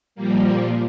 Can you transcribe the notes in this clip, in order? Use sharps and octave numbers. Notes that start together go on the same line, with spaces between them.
A#2 F3 G3 A#3